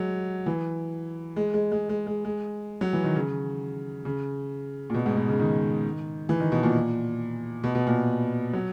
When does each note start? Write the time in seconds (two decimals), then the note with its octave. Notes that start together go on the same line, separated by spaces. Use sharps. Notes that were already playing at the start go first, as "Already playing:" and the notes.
Already playing: F#3 G#3
0.46 E3
1.36 G#3
1.54 G#3
1.72 G#3
1.89 G#3
2.07 G#3
2.25 G#3
2.81 F#3
2.93 E3
3.04 D#3
3.16 C#3
4.05 C#3
4.90 A#2
4.94 B2
5.06 G#2
5.17 B2
5.28 C#3
5.40 D#3
6.29 E3
6.40 D#3
6.52 B2
6.63 A#2
7.64 B2
7.75 B2
7.87 A#2
8.53 F#3